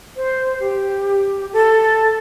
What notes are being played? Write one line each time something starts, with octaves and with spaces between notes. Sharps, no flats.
C5
G4
A4